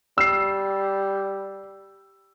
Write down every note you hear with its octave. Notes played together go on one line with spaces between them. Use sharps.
G3 E6 C7